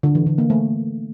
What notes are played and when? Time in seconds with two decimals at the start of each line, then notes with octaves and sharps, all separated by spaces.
0.03 D3
0.15 E3
0.27 D3
0.38 A#3
0.50 A3